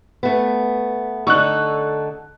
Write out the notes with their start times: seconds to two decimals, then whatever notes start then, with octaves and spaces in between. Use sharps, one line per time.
0.23 A3 B3
1.27 D3 D#4 A4 C#6 F#6